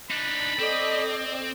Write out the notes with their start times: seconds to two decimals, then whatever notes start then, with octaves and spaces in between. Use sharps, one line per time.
0.11 D4 D#4 B5
0.59 C4 A4 D5 D#5